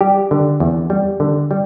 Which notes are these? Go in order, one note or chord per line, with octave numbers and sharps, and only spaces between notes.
G3 G4
D3
E2
G3
D3
G3